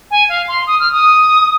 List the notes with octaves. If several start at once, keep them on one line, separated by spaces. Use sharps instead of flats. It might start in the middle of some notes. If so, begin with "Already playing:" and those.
G#5
F5
C6
D#6
F6
D#6